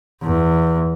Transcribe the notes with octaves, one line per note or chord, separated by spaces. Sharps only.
E2